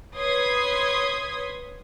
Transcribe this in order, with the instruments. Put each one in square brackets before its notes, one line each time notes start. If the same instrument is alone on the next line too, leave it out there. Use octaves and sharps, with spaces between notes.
[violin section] B4 C#5 C6 D#6 G#6 B6